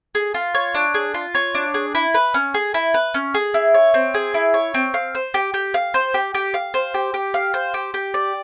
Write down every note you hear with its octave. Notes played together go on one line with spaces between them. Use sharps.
G#4
F4
C#5
D4
G#4
F4
C#5
D4
G#4
E4
B4
C#4
G#4
E4
B4
C#4
G#4
E4
C#5
C4
G#4
E4
C#5
C4
F5
C5
G4
G4
F5
C5
G4
G4
F5
C5
G4
G4
F5
C5
G4
G4
D5